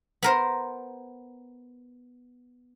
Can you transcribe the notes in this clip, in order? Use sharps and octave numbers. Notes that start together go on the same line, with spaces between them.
B3 A#4 C5